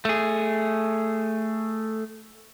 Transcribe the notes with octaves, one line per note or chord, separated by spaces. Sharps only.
A3 G#4